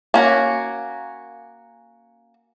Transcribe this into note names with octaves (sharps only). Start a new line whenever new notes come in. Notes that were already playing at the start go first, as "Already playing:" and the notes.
A#3 C#4 F#4